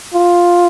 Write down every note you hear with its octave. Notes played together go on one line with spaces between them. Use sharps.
F4